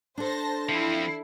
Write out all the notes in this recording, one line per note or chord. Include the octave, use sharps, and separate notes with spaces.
D4 A4 C5 A5 A#6
F3 C4 E4